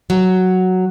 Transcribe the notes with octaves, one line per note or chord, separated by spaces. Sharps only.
F#3